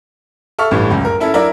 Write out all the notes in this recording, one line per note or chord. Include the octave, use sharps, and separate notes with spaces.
A4 E5 C#6 F6
A1 G2 E3 A3
C#2 F#2
A#4
C#4 E4 A4
F#3 D4 E4 A#4 D5 E5